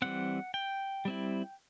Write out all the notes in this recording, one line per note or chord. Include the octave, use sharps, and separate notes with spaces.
E3 G3 C4 F#5
G5
G3 C4 E4